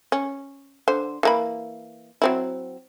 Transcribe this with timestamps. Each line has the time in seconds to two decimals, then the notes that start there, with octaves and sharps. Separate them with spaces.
0.12 C#4
0.88 D3 C5
1.23 E3 A#3 B5
2.22 F#3 C4 E4